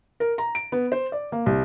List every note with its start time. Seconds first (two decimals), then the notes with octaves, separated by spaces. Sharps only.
0.20 A#4
0.38 A#5
0.55 D7
0.72 B3
0.92 C5
1.12 D5
1.32 A#3
1.46 C2